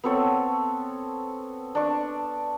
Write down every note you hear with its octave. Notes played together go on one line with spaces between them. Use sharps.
B3 C4 A4 C#5
D4 C#6